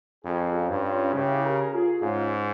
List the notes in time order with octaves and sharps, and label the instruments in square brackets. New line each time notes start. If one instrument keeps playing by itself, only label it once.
[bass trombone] F2 [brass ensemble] F4 G#4
[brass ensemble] C#4 F4
[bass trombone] G2
[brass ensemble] C#4 F4
[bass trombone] C#3 [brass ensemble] E4 G4
[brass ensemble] G4 A#4
F4 G#4
[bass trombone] G#2 [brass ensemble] C#4 F4